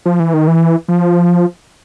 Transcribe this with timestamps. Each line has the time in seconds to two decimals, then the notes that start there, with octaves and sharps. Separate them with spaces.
0.06 F3
0.20 E3
0.34 D#3
0.47 E3
0.88 F3